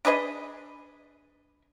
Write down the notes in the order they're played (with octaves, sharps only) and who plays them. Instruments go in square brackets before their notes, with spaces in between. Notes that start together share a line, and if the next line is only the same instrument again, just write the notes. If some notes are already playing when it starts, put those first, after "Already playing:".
[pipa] D4 G#4 B4 D#5